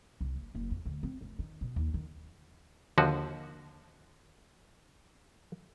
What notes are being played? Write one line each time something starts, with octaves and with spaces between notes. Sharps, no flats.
C2
F#1
F#1
F2
D2
C4
F1
D#3
B2
D#2
D#3
D#2 D3 F3 F#4